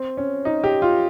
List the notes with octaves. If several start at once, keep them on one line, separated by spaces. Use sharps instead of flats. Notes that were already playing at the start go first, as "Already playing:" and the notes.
Already playing: C4
C#4
D#4
G4
F4